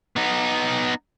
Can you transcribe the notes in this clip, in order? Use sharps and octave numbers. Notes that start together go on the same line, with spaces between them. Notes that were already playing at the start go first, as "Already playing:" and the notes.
B3 D#4